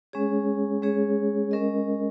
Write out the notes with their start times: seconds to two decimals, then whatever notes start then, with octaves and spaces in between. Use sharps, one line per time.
0.13 G#3 C#4 G#4 C#5
0.82 G#3 C#4 G#4 C#5
1.51 G#3 C#4 A#4 D#5